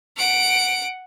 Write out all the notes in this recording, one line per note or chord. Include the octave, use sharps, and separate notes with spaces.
F#5 D7